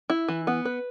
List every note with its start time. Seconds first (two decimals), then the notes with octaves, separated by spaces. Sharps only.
0.10 E4
0.28 E3
0.47 B3
0.65 B4